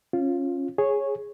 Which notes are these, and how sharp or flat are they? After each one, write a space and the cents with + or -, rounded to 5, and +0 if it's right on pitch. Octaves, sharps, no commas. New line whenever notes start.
C#4 -20 F4 +0
G#4 +0 C#5 -10